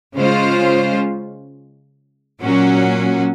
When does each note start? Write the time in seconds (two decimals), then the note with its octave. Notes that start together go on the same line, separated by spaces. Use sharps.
0.15 C#3 G#3 C#4 F4 C5
2.42 A#2 F#3 C#4 F#4